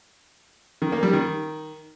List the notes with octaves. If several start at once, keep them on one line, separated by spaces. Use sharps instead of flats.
D#3
A#3
G3
D#3